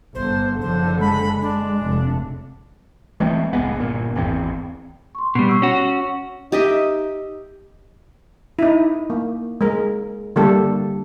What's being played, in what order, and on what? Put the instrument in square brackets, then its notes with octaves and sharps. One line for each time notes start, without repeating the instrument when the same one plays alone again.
[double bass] G1 D3 [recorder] C5
[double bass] F#1 D3 [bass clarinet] F3 [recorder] C5
[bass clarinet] G#3 [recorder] B5
[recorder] D4
[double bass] F1 C3
[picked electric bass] E3 G#3 A3 C4
D1 C2 G#3 B3
G1 A#2
G#1 E2 C4
[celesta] C6 C#6
[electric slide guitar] B2 G3 [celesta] C7
[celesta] C#6 E6
[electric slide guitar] C#4 F#4
[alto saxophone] D#4 [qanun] G4 D#5 E5
[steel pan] D#4 E4
A#3
G#3 A#4
D3 G3 A#3 G4 A4